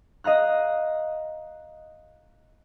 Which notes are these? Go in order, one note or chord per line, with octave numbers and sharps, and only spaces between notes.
D#5 F5 A#5 F#6